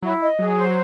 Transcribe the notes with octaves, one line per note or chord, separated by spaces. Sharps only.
F#3 E4
D#5
F#3 G#4
C5